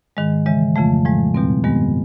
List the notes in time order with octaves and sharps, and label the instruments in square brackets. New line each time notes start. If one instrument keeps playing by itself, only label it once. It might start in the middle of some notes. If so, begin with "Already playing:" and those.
[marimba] G#2 D#3 G#3
C#3 E3 G#3
F2 C#3 F3 A3
A2 F3 G#3
E2 B2 G3 C4
G2 D#3 G#3 B3